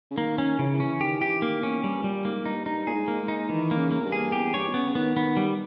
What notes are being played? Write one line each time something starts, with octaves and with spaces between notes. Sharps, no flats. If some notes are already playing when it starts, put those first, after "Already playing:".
C#3
D#3 A#3
C#4
C#3 E3
E3
C#4
D#3 G4
E3 G4
D#3 A#3
E2 C#4
G2 G3
A#2 G3
G#2 A#3
G2 D#4
G2 D#4
A#2 G#4
G#2
A#3
G#2
D#4
D#3 E3
A#3
C#3
A#3
E2
G2
G#4
E2 G4
G2 C#5
B2
C#3 B3
C#3
D#3 B3
D#3 B3
G3